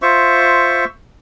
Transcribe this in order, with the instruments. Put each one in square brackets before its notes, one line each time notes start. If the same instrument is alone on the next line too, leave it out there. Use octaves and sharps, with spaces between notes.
[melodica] F4 C5 E5 C#6